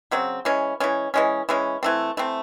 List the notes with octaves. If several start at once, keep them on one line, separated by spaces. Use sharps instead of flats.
C#3 F#3 C4
E3 G#3 C#4
E3 G#3 C#4
E3 G#3 C#4
E3 G#3 C#4
E3 A3 C4
E3 A3 C4